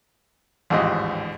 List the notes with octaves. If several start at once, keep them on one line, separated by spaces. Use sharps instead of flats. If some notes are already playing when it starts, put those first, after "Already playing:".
A1 D#2 G#2 F3 G4 D#5